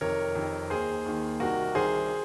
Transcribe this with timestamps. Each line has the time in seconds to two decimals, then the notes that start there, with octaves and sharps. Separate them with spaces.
0.01 F2 C3 D#3 A#4 C#5
0.35 F2 C3 D#3
0.70 D#2 D#3 G#4 C5
1.06 D#2 D#3
1.40 C2 C3 D#3 F#4 A#4
1.75 C2 C3 D#3 G#4 C5